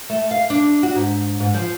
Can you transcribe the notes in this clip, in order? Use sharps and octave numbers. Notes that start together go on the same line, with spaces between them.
A3
F5
D4
F#4
G#2
G#2
F3